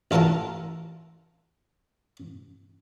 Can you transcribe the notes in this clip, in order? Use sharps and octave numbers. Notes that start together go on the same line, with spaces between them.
A1 F4 A4 A#4 F#5 A5